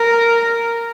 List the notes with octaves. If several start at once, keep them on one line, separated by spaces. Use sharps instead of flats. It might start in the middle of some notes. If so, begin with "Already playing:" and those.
Already playing: A#4